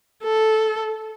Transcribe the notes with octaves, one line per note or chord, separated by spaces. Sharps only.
A4